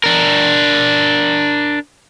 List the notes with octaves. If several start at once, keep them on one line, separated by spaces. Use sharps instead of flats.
D4 A#4